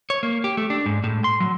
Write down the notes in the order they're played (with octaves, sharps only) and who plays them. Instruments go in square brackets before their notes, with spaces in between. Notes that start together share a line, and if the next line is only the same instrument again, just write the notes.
[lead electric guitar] C#5
A#3
G4
A3
D4
G#2
A2
C6
F#3